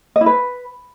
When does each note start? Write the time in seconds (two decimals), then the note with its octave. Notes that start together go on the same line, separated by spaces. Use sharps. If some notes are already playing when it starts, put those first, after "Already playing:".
0.16 D#5
0.21 E4
0.26 B4